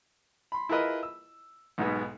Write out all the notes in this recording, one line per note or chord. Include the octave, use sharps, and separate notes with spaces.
B5 C6
E4 F4 G#4 A#4 B4 D#5
E6
B1 G#2 B2 G#3 B3